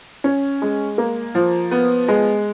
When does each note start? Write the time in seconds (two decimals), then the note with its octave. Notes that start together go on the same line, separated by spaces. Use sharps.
0.24 C#4
0.62 G#3
0.98 A#3
1.35 F3
1.71 B3
2.08 G#3